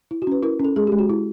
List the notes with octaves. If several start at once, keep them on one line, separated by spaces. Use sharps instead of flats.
E4
F#4
C#4 B4
E4 A#4
C#4 A4
G#3 G#4
G#3 G4
F#4
E4